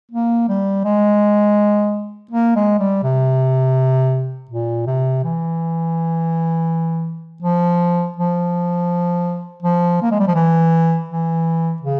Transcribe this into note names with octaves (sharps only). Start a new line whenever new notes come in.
A#3
G3
G#3
A#3
G#3
G3
C3
A#2
C3
E3
F3
F3
F3
A#3
G#3
G3
F3
E3
E3
C#3